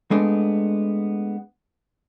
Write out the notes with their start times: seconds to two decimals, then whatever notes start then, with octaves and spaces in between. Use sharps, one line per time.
0.11 G#3 A3 B3 D4